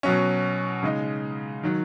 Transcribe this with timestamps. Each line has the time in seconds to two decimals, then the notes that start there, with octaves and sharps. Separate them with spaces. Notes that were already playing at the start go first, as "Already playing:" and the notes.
0.03 B2 F#3 C#4
0.83 C#3 G#3 D#4
1.63 D#3 F#3